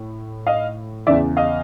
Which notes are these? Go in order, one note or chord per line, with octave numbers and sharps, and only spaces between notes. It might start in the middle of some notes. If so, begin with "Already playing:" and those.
Already playing: A2
D#5 F5
E2 C#3 E3 D5 E5
D#5 F5